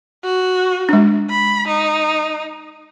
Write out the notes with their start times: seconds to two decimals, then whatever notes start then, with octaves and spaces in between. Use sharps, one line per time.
0.24 F#4
0.89 G#3 D4
1.29 B5
1.67 D#4